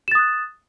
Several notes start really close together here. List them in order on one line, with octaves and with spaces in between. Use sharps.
E7 A6 D#6 F#6